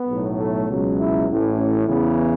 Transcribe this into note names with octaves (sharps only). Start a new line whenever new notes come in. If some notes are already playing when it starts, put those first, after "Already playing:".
Already playing: B3
B1 A2 F#3
A3
C#2 B2 F#3
E4
A1 A2 E3
C#4
E2 C#3 E3 B3